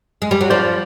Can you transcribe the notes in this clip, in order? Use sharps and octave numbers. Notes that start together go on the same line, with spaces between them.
G#3
G3
F#3
F3 C5 D5